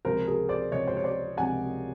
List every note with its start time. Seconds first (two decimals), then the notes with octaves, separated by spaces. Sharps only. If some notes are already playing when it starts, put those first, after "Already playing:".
0.05 C#2 C3 F3 A#4 C5
0.27 G#4 A#4
0.49 C5 D5
0.72 C#2 C3 F3 C#5 D#5
0.88 C5
0.97 C#5
1.04 C5 D5
1.37 C#2 C3 F3 F#5 G#5